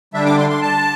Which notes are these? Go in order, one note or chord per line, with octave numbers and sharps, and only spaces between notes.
D3 G3 D4 E5
D6
C6
C6
A5